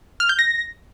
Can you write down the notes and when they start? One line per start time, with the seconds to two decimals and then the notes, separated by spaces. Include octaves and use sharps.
0.20 F6
0.29 G6
0.39 A#6